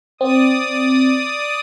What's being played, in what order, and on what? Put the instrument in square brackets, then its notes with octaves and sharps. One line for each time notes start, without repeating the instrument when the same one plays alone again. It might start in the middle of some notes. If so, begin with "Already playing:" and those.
[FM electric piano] C4 [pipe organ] D5 D#6